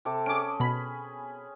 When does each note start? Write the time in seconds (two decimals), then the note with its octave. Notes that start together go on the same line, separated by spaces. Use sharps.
0.05 C3 A4 D6
0.26 C#4 G#4 D6 D7
0.60 B2 B5